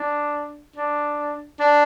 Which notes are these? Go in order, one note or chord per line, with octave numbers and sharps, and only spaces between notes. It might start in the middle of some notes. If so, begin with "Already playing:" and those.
Already playing: D4
D4
D4